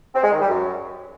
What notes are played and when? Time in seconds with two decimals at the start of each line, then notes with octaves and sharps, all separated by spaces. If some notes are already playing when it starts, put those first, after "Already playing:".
0.15 C4
0.24 G#3
0.32 D#3
0.41 G3
0.49 F#2